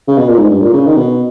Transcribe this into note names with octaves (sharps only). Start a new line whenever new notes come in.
C#3
B2
A#2
G#2
G2
A#2
C#3
D#3
B2